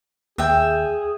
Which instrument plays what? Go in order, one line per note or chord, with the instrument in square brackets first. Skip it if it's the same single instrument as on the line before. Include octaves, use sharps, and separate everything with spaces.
[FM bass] D#2 [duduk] G#4 [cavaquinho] E5 G5